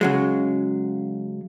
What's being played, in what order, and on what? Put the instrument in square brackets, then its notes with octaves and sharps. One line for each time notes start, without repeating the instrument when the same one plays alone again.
[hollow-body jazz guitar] C#3 F#3 G#3